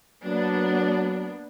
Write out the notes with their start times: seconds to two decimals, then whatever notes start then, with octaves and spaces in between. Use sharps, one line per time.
0.25 F#3 A#3 B3 D4